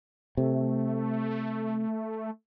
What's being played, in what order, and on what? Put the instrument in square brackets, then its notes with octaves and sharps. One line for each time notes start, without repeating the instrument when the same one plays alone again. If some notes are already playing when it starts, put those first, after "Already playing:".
[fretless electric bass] C3 [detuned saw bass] A3